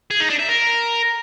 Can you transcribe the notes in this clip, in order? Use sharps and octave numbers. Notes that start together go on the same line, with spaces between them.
G#4
D#4
D4
E5
A#4